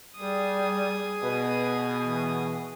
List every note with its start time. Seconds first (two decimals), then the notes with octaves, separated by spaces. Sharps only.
0.18 G3 G#4 D#6
1.23 B2 B4
1.99 E3